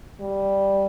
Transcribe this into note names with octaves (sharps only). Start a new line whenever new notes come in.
G3